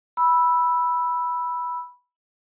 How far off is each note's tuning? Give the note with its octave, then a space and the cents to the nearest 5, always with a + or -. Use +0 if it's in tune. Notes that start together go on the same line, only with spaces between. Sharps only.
B5 -10 E6 +0